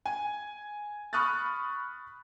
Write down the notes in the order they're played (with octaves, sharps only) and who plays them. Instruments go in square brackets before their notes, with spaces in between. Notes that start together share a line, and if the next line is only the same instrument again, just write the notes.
[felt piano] G#5
B5 C#6 D#6 F6 F#6 A6